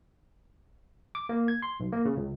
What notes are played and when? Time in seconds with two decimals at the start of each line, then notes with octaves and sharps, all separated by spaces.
1.15 D6
1.29 A#3
1.48 G#6
1.62 C6
1.80 B1
1.92 A#3
2.05 C#3
2.17 C#2